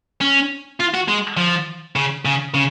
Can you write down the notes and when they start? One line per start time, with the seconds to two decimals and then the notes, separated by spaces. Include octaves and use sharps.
0.21 C#4
0.80 F4
0.94 F#4
1.08 G#3
1.37 F3
1.96 C#3
2.25 C#3
2.54 C#3